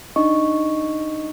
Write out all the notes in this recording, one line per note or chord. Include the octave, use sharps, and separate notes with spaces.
D4 D#4 D#5 C#6